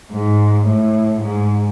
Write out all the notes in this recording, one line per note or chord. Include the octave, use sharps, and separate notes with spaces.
G#2
A2
G#2